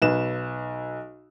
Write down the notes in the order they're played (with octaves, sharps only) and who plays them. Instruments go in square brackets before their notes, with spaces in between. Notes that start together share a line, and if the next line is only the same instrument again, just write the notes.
[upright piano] B1 B4 E7